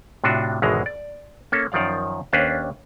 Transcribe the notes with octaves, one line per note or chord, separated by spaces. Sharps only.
A2 C3 D4 F4 F#4
G#1 E2 B2 D3 G#3 A#5
D5
A#3 C#4 A4
F#2 D#3 F3 D5 F5
D#2 C#4 D4 B4 C5 F5